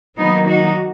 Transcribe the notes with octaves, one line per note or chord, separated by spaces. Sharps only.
D#3 F#3 A#3 B3 D#4
D#4 F#4